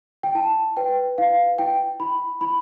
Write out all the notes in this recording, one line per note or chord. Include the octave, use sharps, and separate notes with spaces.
G5
E4 A5
B4 G5
E4 F5
E4 G5
E4 B5
E4 B5